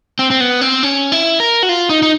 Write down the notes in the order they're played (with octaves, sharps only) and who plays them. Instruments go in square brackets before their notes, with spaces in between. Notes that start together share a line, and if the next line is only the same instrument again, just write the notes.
[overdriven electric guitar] C4
C4
B3
C4
C#4
E4
A#4
F#4
F4
D#4
D#4